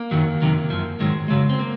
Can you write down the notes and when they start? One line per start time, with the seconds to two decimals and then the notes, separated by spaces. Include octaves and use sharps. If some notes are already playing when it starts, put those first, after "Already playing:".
Already playing: A#3
0.11 F#2 D#3 F#3
0.42 F2 C3 D#3 F#3
0.70 F#2 F3
1.00 G#2 D#3 F#3 G#3
1.28 F#2 C#3 F#3 G#3
1.49 C4
1.59 A#3